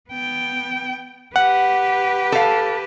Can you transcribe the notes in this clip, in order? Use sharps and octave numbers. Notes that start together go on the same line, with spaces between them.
B3 G5
G4 B4 F#5
A4 F5